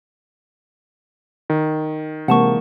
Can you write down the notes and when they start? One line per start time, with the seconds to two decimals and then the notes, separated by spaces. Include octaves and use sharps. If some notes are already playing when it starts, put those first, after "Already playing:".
1.50 D#3
2.28 C3 E3 G#3 A#3 F#5 A5 C#6